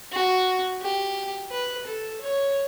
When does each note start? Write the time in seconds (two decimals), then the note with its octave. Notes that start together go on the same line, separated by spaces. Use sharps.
0.12 F#4
0.82 G4
1.52 B4
1.87 A4
2.21 C#5